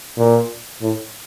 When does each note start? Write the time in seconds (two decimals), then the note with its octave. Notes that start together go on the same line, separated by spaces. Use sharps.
0.18 A#2
0.82 A2